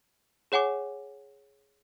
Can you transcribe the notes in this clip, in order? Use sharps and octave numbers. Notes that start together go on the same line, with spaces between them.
G#4 C#5 F#5 G#5 D6